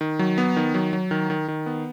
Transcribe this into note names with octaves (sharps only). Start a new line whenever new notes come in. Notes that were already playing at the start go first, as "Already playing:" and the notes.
D#3
F#3
B3
D#3
F#3
F#3
D#3
D#3
D#3
B3